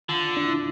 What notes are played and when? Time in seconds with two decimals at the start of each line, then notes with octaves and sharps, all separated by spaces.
0.09 D3 F4
0.37 D4
0.44 E4